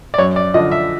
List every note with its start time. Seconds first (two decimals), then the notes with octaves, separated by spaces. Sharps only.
0.14 D5
0.18 F#2 C#5
0.36 D5
0.54 D3 F3 D#5
0.72 E5